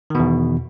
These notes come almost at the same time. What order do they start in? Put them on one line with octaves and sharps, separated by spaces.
D#3 B2 E2